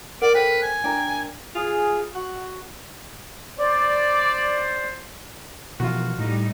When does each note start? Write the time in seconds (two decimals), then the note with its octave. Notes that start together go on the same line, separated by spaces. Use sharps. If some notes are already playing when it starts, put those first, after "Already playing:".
0.22 A#4 D5 F#5
0.35 A4 B4 C5 G5
0.62 G#5
0.84 D4 A#4 G5
1.55 F4 G#4
2.15 F#4 F#5
3.58 C5 D5
5.80 B2 E3 F3 F4 F#4
6.18 A2 G3 D#4